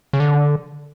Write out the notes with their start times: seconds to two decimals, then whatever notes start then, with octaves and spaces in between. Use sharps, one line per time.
0.13 C#3
0.20 D3